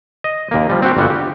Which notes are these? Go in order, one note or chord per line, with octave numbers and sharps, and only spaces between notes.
D#5
D#2 A#3
F3 G3
C4 F#4 G4
G1 G3 G#3 F#4
G4